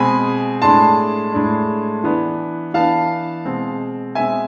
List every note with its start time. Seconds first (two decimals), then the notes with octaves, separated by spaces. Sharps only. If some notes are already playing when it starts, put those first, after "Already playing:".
Already playing: B2 G#3 C4 G#5 B5
0.62 A2 G#3 D4 A5 C6
1.33 A2 G#3 D4
2.03 E3 B3 D4
2.74 E3 B3 D4 F5 A5
3.45 B2 G#3 C4
4.15 B2 G#3 C4 E5 G#5